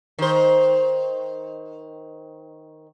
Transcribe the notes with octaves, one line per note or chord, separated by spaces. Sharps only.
D#3 C5